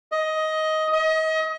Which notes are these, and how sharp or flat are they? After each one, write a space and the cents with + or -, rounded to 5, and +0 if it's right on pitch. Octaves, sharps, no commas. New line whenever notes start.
D#5 +15
D#5 +35